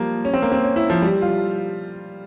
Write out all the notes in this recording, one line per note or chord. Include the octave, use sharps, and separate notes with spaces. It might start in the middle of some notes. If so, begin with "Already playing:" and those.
Already playing: F3 G3 A#3
C#4
C4
A#3
C4
C#4
E4
F3
G3
F4